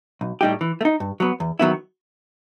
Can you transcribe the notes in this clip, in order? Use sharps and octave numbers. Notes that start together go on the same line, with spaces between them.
B1
A2 G3 D#4 G4
E3
A3
D#4
G2
F#3 B3
E2
D#3 F#3 B3 E4